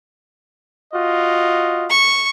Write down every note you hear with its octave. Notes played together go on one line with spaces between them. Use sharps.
F4 F#4 D#5
C#6